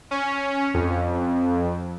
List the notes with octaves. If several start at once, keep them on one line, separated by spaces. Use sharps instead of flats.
C#4
F2